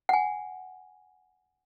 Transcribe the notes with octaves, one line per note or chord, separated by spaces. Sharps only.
F#5 G#5